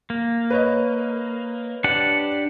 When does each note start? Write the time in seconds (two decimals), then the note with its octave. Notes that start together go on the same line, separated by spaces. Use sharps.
0.10 A#3
0.50 B4 C#5 D#5
1.84 D4 G4 F#5